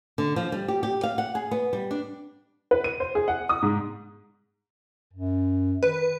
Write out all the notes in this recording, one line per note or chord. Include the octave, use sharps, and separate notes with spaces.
D3
F3
G3
G4
G4
F5
F#5
G#4
B3
G3
D4
B4
D#7
C5
G#4
F#5
D#6
G#2
F#2
D#3 B4